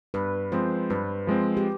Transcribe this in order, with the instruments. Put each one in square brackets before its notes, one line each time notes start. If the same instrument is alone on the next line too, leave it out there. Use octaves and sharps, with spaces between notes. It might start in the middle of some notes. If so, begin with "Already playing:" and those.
[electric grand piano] G2 [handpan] B4
[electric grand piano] F3 G#3 C4 [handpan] C5
[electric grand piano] G2 [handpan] B4
[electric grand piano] F3 G#3 C4
[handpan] G4